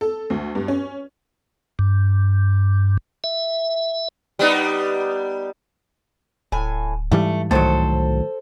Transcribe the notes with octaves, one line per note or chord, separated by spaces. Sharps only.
A4
D2
G2
C#4
G2
E5
G3 B3 D#4
D1 A2 G#5
G#2 E3 G3 A3
C2 A2 D#3 F#3 A4 C5